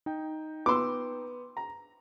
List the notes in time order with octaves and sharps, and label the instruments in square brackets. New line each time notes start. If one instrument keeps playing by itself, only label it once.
[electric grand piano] D#4 G5
[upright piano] B3 E6 [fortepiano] C6 D6
[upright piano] A#5